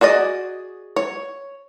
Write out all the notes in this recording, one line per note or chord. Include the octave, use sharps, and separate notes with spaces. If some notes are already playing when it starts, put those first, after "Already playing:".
F#4 G#4 D5 D#5
C#5